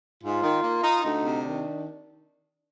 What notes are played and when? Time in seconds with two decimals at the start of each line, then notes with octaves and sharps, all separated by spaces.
0.24 G#2 F4
0.43 D#3
0.63 A#3
0.83 D#4
1.04 D2 D#4
1.23 C3
1.43 D#3 D4